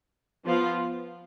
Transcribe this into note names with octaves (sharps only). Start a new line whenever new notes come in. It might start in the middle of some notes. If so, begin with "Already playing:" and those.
F3 B3 F4